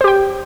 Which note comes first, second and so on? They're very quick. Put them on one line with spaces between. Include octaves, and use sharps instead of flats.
C5 G4 G5